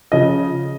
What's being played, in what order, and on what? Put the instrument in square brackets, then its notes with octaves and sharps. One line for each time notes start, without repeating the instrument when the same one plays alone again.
[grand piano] C#3 F3 D#5